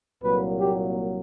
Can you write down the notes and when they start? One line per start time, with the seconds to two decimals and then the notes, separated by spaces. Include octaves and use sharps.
0.23 C2 A#2 F#3 A#3 B4
0.60 G4